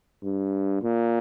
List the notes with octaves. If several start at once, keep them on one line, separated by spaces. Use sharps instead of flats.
G2
A#2